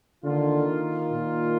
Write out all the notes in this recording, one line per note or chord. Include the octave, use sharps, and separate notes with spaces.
D3 D#3 A#3 F4
A#2